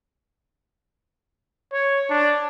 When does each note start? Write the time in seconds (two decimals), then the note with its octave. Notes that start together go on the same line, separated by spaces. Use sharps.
1.73 C#5
2.10 D4